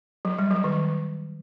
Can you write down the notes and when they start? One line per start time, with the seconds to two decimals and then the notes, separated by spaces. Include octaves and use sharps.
0.25 F#3
0.39 G3
0.51 F#3
0.64 D#3